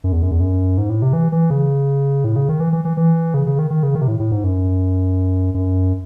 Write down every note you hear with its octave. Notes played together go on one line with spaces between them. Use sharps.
F#2
E2
F#2
E2
F#2
G#2
A2
C3
E3
E3
C#3
A2
C#3
D#3
E3
E3
E3
E3
C#3
C#3
D#3
D#3
C#3
D#3
C3
A2
A2
G#2
F#2
F#2